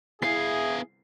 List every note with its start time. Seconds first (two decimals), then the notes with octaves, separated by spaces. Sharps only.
0.22 B3 E4 G#4 F5 C7